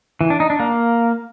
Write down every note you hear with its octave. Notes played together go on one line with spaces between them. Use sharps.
E3
D4
D#4
D4
A#3